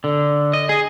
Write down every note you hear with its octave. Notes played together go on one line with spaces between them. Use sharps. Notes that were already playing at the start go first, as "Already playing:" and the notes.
D3
D#5
G#4